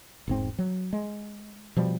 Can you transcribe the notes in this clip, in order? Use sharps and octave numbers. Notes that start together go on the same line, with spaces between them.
E1 G#2 C4
F#3
G#3
B2 F3 G3